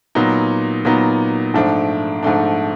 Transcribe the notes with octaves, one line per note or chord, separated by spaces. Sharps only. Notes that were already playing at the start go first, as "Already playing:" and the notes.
A#2 F#3 B3 D#4
A#2 F#3 B3 D#4
G#2 F3 A3 D4
G#2 F3 A3 D4